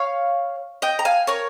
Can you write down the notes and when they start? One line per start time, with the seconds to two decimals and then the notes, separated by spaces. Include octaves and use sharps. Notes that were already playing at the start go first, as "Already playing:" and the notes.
Already playing: C#5 F5
0.82 D#5 G5
0.99 A#5
1.05 F5 G#5
1.27 A#4 C#5